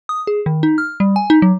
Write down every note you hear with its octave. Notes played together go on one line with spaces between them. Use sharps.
D#6
G#4
D#3
D#4
F6
G3
G#5
D#4
F#3